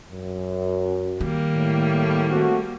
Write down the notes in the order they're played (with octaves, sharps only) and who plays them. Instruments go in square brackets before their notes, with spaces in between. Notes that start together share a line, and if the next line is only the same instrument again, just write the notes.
[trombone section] F#2
[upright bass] D#3 [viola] G3 A#3
[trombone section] A2
A3 C4 F#4